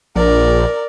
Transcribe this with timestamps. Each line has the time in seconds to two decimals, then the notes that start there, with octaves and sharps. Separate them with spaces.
0.15 A#1 A#4 D5